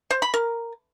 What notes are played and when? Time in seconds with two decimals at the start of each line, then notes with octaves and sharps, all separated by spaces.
0.11 C5
0.22 B5
0.34 A#4